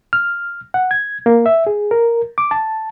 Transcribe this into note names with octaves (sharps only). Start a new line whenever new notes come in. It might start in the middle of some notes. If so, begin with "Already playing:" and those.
F6
F#5
G#6
A#3
E5
G#4
A#4
D6
A5